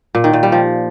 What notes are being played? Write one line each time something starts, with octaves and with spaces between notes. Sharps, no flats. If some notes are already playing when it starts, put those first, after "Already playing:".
A#2
D#3
A#2
G3
F3